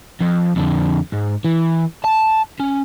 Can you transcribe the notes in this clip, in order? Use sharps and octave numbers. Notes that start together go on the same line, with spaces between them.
F2
F2 D3
G#2
E3
A5
C#4